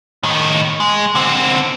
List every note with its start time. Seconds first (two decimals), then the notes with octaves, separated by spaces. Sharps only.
0.23 A2 D#3
0.80 G#3
1.15 D3 C4